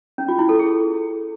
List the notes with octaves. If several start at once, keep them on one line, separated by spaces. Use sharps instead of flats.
C#4
F4
E4
A4
G#4